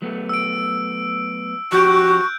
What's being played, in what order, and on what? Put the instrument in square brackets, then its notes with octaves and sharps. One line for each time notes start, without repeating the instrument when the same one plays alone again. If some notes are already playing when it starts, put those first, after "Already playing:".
[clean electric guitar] F#3 A3 B3
[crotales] E6 D7
[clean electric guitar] F3 C#4 G4 [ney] F#4 [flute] C#6 [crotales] F#6 G6 D7